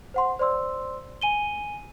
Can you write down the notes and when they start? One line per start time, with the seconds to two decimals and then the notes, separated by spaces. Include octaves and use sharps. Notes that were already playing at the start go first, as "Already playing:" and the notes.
0.14 C5 F#5 C6
0.39 C5 D5 C6 E6
1.21 G#5 D#7 G7